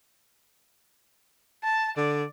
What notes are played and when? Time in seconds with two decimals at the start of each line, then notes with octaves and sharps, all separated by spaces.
1.63 A5
1.97 D3 D5